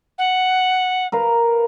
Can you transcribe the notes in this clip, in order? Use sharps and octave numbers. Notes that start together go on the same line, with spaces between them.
F#5
A#4 B4 F5